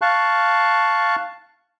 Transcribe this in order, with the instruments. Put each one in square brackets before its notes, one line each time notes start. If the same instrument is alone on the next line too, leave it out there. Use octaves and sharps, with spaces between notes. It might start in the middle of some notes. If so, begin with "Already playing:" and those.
[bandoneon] F5 A5 C#6 F#6